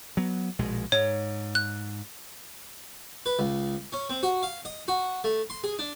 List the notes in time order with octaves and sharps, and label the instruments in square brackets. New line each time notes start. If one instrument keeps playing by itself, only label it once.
[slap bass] F#3 B3
A#1 B2 G#3
[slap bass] G#2 [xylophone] C#5
[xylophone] F#6
[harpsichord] B4
C#2
C#4
C4
F#4
F5
D#5
F#4
A3
C6
G#4
D4